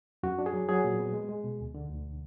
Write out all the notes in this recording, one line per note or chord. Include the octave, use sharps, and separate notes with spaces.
F#2 F#4
D4
G#4
F#3
F#3 G#4
A#2
B3
G#3
G#3
B2
D2
D3
D2